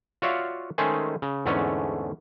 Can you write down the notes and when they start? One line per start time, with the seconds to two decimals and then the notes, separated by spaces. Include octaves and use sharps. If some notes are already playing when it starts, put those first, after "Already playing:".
0.22 F4 F#4 C#5 D5 E5 F5
0.78 D#3 G#3 A3 C#4 G#4 C5
1.22 C#3
1.46 E2 G#2 D3 A3 C#4